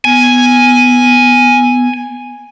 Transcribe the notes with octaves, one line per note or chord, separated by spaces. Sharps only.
B3 G#5